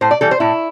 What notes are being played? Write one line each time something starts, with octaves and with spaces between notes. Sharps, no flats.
A2 C5
D5
E3 G3 A4
C5
A2 E4